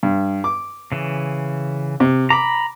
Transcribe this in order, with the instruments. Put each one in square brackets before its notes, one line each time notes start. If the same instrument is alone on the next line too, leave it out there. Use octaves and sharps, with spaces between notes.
[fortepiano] G2
D6
[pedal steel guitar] C#3 E3
[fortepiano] C3
[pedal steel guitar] A#5 B5 [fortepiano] D6